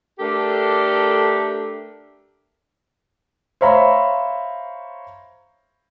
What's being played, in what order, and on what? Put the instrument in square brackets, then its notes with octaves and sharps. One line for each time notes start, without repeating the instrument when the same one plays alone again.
[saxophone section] A3 D4 G4 A4 A#4
[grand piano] C5 C#5 E5 F5 A#5 B5